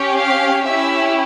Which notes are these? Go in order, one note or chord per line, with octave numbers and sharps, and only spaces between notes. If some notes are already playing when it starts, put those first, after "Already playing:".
Already playing: C#4 G4
F5
C#4 E4 G4 E5